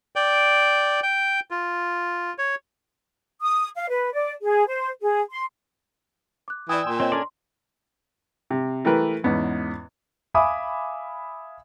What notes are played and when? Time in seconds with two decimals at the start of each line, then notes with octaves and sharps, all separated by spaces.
0.16 D5 G5
1.03 G5
1.51 F4
2.38 C#5
3.42 D#6
3.76 F5
3.89 B4
4.14 D5
4.42 G#4
4.68 C5
5.01 G#4
5.31 C6
6.48 D6 F#6
6.69 E3 D5 G5 G#5 D#6 E6
6.87 A#2 C6
7.00 C4 C#5 D#5
7.12 C#4 D4 A4 A#4 D5 G#5 C6
8.50 C3
8.85 E3 A3 G4 A#4 B4
9.24 E2 G#2 B3 C#4
10.34 E5 F5 G#5 B5 D6 D#6